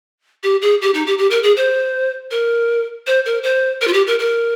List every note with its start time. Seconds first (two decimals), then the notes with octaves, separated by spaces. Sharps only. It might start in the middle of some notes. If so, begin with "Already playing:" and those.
0.43 G4
0.62 G#4
0.82 G4
0.94 D#4
1.07 G4
1.18 G4
1.31 A#4
1.43 G#4
1.57 C5
2.31 A#4
3.07 C5
3.26 A#4
3.43 C5
3.81 A#4
3.88 F4
3.93 G4
4.07 A#4
4.19 A#4